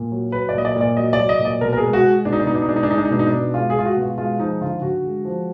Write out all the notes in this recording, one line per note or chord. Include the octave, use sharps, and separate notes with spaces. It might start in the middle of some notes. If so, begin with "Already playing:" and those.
Already playing: A#2
F#3
F#3 B4
D5
A#2 D#5
D5
A#2
D5
F#3 D#5
D5
F#3
D#5
A#2
D5
B2 A#4
A#4
G#4
G#3
F#4
G#3
B2 D4
D#4
D4
B2 D#4
D4
D#4
G#3 D4
D#4
D4
G#3 D#4
D4
D#4
B2 D4
D#4
D4
B2
G#3 F4
G#4
G#3 F4
F#4
B2
F4
G#3 F4
F3 D#4
D3 F4
D3 F#4
G#3
F3